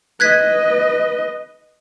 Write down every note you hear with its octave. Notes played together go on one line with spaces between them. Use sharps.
B4 D#5 F#6 G#6 B6